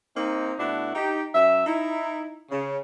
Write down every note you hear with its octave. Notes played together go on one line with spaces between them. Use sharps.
A#3 C4 D#4
B2 A3 D4 E4 F#5
D#4 G4
F#2 E5
D#4 E4
C#3